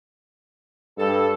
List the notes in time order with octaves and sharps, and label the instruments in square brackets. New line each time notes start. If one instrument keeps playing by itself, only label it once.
[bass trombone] G2 [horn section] A4